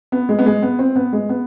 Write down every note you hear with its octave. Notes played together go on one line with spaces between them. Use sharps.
B3
G#3
B3
G#3
B3
C4
B3
G#3
B3